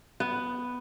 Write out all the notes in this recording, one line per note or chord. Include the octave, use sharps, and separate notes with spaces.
B3